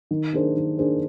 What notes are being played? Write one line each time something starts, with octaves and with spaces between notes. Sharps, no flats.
D#3
A#3 D4 G#4 C5
D#3
A#3 D4 G#4 C5